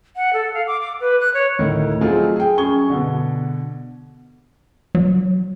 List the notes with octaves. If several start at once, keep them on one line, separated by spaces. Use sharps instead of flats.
F#5
A4
F5
D6
D6
B4
F#6
C#5
D2 A2 D#3
F#3 A3 C4 D#4 F4 G#4
G#4 G5
F#2 G#4 C#6 G#6 G7
B2 D3
F#3